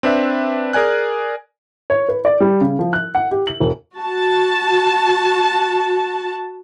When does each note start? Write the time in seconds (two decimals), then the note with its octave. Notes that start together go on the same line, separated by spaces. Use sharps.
0.03 C4 D4 B4 E5
0.73 G#4 A#4 D5 G#5 F#6
1.90 C#5
2.09 B4
2.25 D5
2.40 G3
2.61 C#3
2.79 F3
2.93 F#6
3.15 F#5
3.31 G4
3.47 F#7
3.60 E1
3.96 F#4 A5